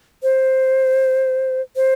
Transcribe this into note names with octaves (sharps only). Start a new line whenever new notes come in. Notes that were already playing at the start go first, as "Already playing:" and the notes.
C5
C5